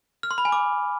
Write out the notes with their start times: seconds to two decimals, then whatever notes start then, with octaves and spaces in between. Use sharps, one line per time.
0.23 F6
0.31 C6
0.38 B5
0.45 G#5
0.52 D6